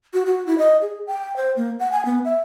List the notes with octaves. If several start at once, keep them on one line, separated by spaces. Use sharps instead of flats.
F#4
F#4
E4
D#5
G#4
G5
C5
A#3
F#5
G#5
B3
E5